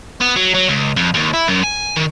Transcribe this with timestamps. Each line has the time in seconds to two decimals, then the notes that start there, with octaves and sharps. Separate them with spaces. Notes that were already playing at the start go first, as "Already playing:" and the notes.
0.21 B3
0.36 F#3
0.54 F#3
0.68 C#2
0.96 F2
1.14 D#2
1.33 E4
1.48 F#2
1.63 G#5
1.96 D#3